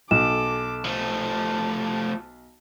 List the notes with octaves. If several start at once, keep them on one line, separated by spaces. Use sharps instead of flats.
B1 A4 D6 E7
F3 A3 A5